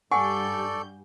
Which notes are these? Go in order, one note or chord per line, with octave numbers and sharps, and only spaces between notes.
G2 G3 A4 D5 F#5 G#5 C#6 G6